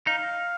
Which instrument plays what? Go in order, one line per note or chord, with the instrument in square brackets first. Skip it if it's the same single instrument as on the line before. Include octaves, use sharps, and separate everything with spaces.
[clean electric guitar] D#4 [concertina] F5